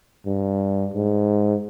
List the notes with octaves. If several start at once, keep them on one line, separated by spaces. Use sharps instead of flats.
G2
G#2